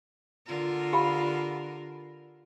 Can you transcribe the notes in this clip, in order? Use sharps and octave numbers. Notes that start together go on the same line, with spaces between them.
D3 F4 A#4
G4 F5 B5